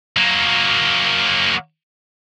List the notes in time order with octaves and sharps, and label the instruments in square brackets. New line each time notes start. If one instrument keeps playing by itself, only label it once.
[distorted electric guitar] F#3 A#3